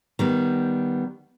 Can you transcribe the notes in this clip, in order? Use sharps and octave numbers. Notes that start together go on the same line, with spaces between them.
D#3 G3 B3